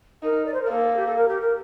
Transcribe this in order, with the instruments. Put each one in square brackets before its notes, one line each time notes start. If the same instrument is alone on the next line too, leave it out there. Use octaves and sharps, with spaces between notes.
[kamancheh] D#4 [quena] A#4
[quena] D5
C5
A#4
[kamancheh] A#3 [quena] A4
[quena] G4
A4
A#4
G4
A#4